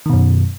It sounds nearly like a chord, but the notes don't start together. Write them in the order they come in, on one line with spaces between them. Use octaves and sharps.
D#3 B2 F#2